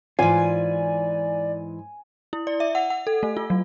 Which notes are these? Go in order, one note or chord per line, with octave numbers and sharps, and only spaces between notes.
G#2 E3 F4 D5 G#5
E4
D5
E5
F#5
F#5
A4
A3
F4
F#3